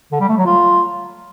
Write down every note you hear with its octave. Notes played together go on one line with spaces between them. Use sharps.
D3
G3
A3
F#3
F4